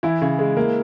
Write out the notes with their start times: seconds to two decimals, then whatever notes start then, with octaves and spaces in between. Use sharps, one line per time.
0.03 E3 E4
0.22 C#3
0.39 G#3
0.57 A#3